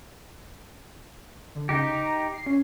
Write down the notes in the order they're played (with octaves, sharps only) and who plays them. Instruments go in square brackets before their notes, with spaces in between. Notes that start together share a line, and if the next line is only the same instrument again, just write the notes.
[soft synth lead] D3
[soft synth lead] C#3 [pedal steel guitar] D#4 G4
[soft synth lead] A#5
C7
C#4